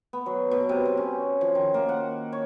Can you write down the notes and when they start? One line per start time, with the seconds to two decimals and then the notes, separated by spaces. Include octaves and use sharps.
0.13 B3
0.26 F#3
0.51 B2
0.69 C3
0.85 C3
0.97 C#4
1.41 F3
1.55 D#3
1.74 A#3
1.89 F#5
2.33 C#5